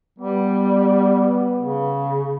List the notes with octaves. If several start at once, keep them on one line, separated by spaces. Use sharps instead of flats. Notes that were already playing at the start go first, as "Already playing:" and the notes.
G3 B3
C#3